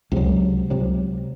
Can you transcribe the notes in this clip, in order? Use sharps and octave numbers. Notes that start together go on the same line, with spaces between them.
C#2 C3 F#3
C#2 C3 F#3